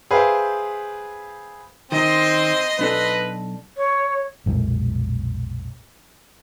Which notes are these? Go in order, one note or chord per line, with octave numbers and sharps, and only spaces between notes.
G#4 B4 C5 E5 F5 G5
D#3 C4 D#5 C6
B1 D4 A4 B4
C#5
B1 F2 A#2 G#3